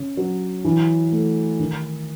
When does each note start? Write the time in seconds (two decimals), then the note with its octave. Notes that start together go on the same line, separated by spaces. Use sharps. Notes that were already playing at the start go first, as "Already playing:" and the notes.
Already playing: C#3
0.17 F#3
0.65 E3
1.12 A3
1.60 D#3